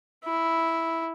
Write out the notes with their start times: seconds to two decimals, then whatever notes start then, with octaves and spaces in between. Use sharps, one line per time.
0.25 E4